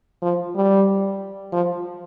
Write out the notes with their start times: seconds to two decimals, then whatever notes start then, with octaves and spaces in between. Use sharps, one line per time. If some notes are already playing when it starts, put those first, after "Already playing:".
0.22 F3
0.56 G3
1.52 F3